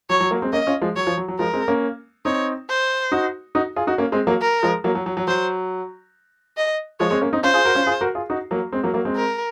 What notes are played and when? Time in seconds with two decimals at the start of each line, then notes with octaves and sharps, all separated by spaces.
0.10 F#3 C#5
0.21 F#3
0.31 F#3 A#3
0.42 G#3 C4
0.53 A#3 C#4 D#5
0.67 C#4 F4
0.82 F3 G#3
0.96 F#3 C#5
1.07 F3
1.17 F#3
1.28 F#3
1.39 F3 G#3 A#4
1.53 G#3 C4
1.68 A#3 C#4
2.25 C4 D#4 C#5
2.69 C5
3.12 D#4 F#4
3.55 D#4 F#4
3.76 F4 G#4
3.87 D#4 F#4
3.98 A#3 C#4
4.12 G#3 C4
4.27 F#3 A#3
4.41 A#4
4.63 F3 G#3
4.84 F#3 A#3
4.95 F#3
5.06 F#3
5.17 F#3
5.27 F#3 C5
6.57 D#5
7.00 F3 G#3 C#5
7.11 G#3 C4
7.21 A#3 C#4
7.33 C4 D#4
7.43 C#4 F4 C5
7.54 F4 G#4
7.65 F#4 A#4
7.75 C#4 F4
7.86 F4 G#4
8.01 F#4 A#4
8.15 F4 G#4
8.30 D#4 F#4
8.51 F#3 A#3
8.72 G#3 C4
8.83 F#3 A#3
8.94 F#3 A#3
9.05 G#3 C4
9.16 A#4